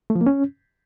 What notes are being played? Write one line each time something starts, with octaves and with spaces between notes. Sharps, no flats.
A3
F3
A#3
C#4